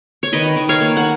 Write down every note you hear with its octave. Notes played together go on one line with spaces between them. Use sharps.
C#5
D#3 B4 D#5
D#3
C#5 F5
A#3
F#5